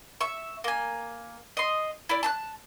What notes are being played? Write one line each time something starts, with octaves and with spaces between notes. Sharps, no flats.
E5 C#6
A#3 G#5
D#5 C6
E4 D5
A5 B5 F#6